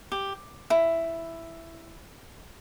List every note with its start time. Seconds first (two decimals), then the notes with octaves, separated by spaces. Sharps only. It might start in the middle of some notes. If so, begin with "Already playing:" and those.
0.12 G4
0.70 E4